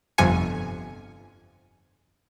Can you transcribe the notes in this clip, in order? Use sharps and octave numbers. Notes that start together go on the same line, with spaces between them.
G1 F2 C3 G#5 C#7